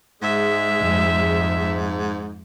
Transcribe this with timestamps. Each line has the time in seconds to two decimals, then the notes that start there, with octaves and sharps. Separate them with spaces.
0.22 G#2 G#3 E5
0.82 F2